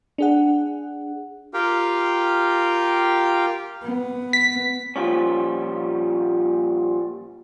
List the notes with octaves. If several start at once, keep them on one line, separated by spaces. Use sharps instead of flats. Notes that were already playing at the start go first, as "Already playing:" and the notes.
D4 G#4 F#5
F4 G4 A#4 F5 G5
B3
B6
A#2 F3 G3 C#4